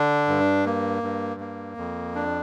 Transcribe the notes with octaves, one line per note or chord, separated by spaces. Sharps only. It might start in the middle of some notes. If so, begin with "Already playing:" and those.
Already playing: D3 D4
G2
A#3
G2
A#3
F2
D4